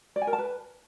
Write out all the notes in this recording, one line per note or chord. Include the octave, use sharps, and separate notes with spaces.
D5
G#5
A#4
A5
B4